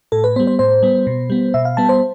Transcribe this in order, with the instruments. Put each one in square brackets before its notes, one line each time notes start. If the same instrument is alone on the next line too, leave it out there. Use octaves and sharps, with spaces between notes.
[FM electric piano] A2 A4
B4
B3 C5
G3
C5
A2 C5
G3 B3
B2
G3 B3
B2 E5
F5
G3 B3 A5
C5